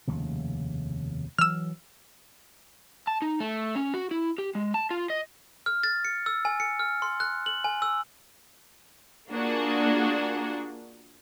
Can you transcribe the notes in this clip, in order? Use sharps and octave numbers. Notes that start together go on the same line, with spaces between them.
F1 D#2 C#3
E3 F#3 E6 F6
A5
D#4
A3
C#4
F#4
E4
G4
G#3
A5
F4
D#5
F6
A6
C#7
E6
G#5
C#7
F6
C6
F#6
F#7
G#5
E6
A#3 D4 F4 F#4 G#4